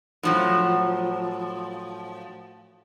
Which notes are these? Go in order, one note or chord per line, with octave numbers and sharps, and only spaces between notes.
A2 F3 F#3